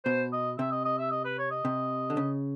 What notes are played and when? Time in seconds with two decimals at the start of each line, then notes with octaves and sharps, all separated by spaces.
0.05 B2 C5
0.32 D#5
0.58 C3 E5
0.72 D#5
0.85 D#5
0.99 E5
1.11 D#5
1.25 B4
1.38 C#5
1.51 D#5
1.65 C3
2.10 D3
2.17 C#3